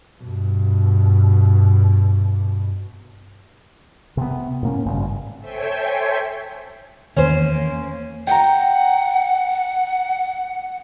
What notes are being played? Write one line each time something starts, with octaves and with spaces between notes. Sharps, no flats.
G2 B2
C3 B3
A2 A#3 C#4
G#1 G2 C#3
A4 C5 C#5 E5 G5 G#5
E2 D#3 A#3 C#4 C5
F#5 G5 A#5